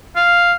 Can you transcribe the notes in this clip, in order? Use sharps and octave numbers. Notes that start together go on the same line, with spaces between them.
F5